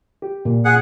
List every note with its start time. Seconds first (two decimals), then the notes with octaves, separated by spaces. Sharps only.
0.22 G4
0.45 A#2
0.65 G#4 F#5